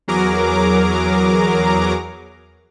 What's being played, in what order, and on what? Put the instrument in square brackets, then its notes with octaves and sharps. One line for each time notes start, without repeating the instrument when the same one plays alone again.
[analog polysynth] E2 F#3 G#4 A#4 A#5 D6